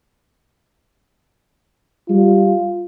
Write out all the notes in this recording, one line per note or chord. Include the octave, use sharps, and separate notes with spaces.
G3 F4